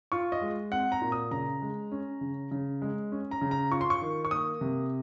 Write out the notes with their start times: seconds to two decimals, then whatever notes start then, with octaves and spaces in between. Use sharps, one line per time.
0.12 F4 C#6
0.32 D#5
0.41 G#3
0.72 C4 F#5
0.92 A#5
1.01 A#2
1.12 D#6
1.31 C#3 A#5
1.62 G#3
1.92 C#4
2.21 C#3
2.51 C#3
2.82 G#3
3.12 C#4
3.31 A#5
3.41 C#3
3.51 A#5
3.71 F4 C#6
3.81 C6
3.90 C#6
4.01 D#3
4.25 C#6
4.31 A#3 D#6
4.61 C3